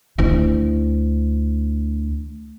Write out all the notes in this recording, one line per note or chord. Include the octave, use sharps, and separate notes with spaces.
D2 E4